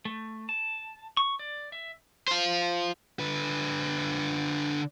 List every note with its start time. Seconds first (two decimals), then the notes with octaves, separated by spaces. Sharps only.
0.05 A3
0.49 A5
1.17 C#6
1.39 D5
1.72 E5
2.28 F4 C5
3.20 D3 B4